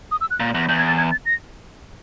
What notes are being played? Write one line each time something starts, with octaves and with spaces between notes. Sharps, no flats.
D#6
E6
F#6
A#2
E2
E2 G6
G#6
A6
G#6
A6
A#6